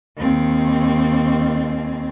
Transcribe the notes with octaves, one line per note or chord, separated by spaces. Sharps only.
D#2 C4